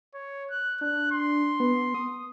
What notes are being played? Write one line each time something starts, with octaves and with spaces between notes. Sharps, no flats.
C#5
F#6
D4 F#6
C6
B3
D#6